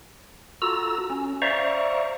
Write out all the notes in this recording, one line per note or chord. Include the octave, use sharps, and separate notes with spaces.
F4 F#4 A4 A#5 E6
C#4
C5 D5 E5 F5 A#5 C#6